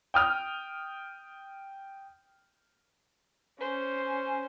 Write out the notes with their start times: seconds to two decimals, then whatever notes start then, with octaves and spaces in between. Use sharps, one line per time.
0.14 G5 D#6 F6
3.61 C#4 C5